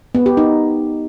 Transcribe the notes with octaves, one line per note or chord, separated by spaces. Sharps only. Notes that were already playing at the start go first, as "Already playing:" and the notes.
B3
G4
D#4